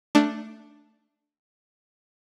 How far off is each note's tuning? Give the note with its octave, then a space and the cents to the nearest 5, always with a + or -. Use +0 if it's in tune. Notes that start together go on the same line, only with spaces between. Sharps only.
A3 +5 D4 +0